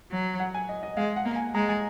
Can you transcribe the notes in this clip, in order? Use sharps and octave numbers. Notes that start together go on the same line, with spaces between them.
F#3
F#5
G#5
D#5
D#5
G#3 F5
F#5
A#3
G#5
G#3 A#5
G#5